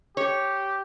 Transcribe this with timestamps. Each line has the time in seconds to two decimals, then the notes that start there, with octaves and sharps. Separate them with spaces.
0.17 G4 C#5